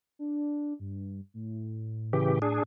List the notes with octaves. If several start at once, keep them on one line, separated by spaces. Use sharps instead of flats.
D4
G2
A2
C#3 E3 G4
D4 G#4